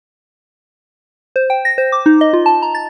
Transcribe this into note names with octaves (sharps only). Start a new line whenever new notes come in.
C5
G5
A#6
C5
D6
D#4
D#5
F4
A5
A#5
A6